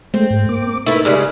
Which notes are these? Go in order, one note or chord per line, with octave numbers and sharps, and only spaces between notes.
G#3 A3 C4
G#2
A#3 D6
A3 D#4 E4 A#4 B4 E5
C#3 G3 G#3